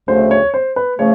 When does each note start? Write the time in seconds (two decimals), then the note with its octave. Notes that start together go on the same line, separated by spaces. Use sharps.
0.08 D2 C#3 F3 A3 C5
0.31 C#5
0.54 C5
0.76 B4
0.99 C#3 F3 A3 C#5